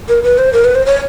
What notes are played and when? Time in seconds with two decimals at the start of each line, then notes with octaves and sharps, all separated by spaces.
0.09 A#4
0.24 B4
0.38 C5
0.53 A#4
0.65 B4
0.75 C5
0.86 C#5